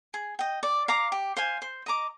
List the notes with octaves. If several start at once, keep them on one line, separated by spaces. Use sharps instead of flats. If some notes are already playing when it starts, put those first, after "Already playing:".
G#4
D#5 G5
D5
F5 A#5 D6
G4
C5 F5 G#5
C5
D#5 A#5 D6